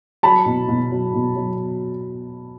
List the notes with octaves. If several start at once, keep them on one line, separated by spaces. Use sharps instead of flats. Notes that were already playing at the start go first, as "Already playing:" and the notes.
F#3 A5 B5
B2
B2
F#3
B2
F#3